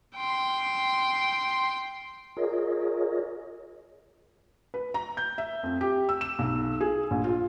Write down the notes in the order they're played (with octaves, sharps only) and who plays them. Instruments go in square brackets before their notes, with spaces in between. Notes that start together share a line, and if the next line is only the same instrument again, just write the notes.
[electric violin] G5 C6
[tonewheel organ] F4 G#4 A#4 C#5 D#5
[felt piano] B4
A#5
G6
E5
F2
G4
E6
E7
B1
G#4
A#1
F4